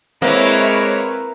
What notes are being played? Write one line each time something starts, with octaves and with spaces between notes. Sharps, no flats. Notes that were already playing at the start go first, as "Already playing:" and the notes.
G#3 A#3 C4 E4 B4 C#5